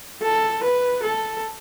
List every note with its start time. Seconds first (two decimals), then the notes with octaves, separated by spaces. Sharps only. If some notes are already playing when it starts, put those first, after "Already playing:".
0.22 A4
0.63 B4
1.03 A4